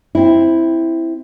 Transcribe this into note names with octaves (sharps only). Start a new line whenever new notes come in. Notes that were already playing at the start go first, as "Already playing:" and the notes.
C4 E4